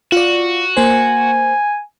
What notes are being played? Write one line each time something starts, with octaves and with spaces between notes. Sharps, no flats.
F4 F#4 D5
A#3 C5 G#5